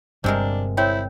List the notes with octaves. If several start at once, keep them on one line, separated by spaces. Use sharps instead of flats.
G1 G2 C3 G#3 D4 A#4
C4 E4 C#5 G5